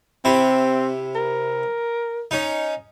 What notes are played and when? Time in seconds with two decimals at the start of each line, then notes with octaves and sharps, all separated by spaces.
0.25 C3 C4 E4
1.16 A#4
2.31 C#4 D#4